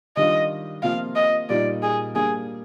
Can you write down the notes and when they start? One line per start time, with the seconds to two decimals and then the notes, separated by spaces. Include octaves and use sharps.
0.17 D#3 G3 D4 F4 D#5
0.83 C3 F3 A#3 F4 F5
1.16 D#5
1.49 A#2 G3 A#3 D#4 D5
1.83 G#4
2.15 G3 A#3 D4 G#4